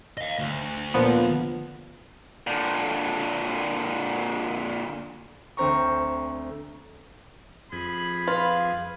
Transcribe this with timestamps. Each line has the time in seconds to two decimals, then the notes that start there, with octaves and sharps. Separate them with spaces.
0.18 D#5 F5
0.39 D2
0.94 A#2 F3 B3
2.47 A#2 D3
5.57 D2 C4 C5 A#5 C#6
7.72 F2 G#4 B5
8.27 F4 B4 F5